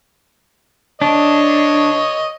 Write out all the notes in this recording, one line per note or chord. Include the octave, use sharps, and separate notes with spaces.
D4 C#5 D#5